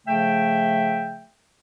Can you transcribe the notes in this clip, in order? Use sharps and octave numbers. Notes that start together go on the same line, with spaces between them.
C#3 F3 A3 E5 G5